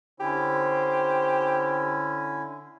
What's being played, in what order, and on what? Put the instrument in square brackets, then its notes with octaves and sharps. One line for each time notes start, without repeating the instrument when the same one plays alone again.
[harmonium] D3 C#4 E4 [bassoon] G4 [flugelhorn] C5